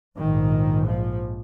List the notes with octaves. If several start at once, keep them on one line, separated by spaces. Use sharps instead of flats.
A#1 G#2 D#3
F3